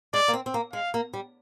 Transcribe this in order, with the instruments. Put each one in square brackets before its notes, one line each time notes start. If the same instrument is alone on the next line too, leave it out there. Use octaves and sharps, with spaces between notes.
[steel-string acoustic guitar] G#3 [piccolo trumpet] D5
[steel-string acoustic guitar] A#3
C4
C4
A#3
[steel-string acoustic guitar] G#3 [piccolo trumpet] F5
[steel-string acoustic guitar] A#3
G3